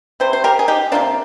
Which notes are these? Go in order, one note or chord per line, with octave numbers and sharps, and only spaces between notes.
C3 G3 C5
C5
G4 A#4
G#4
D#4 G4
C3 G3 A#3 D4 F4